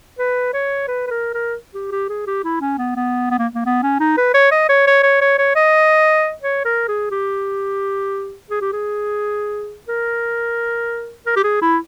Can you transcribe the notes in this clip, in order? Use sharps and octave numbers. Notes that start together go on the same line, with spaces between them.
B4
C#5
B4
B4
A#4
A#4
G4
G4
G#4
G4
E4
C#4
B3
B3
B3
A#3
A#3
B3
C#4
D#4
B4
C#5
D#5
C#5
C#5
C#5
C#5
C#5
D#5
C#5
A#4
G#4
G4
G#4
G4
G#4
A#4
A#4
G4
G#4
E4